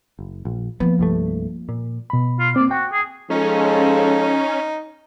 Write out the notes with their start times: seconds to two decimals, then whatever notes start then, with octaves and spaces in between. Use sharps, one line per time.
0.19 F#1
0.45 A#1
0.80 F3 A#3 B3
0.99 C2 G2 A3
1.69 A#2
2.10 B2 B5
2.39 F4
2.56 A#3 C4 D5
2.71 F#4 G5
2.92 G#4
3.30 F3 G#3 C#4 D#4 A4